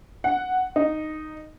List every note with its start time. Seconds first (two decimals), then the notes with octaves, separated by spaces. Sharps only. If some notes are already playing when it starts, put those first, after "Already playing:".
0.24 F#5
0.76 D#4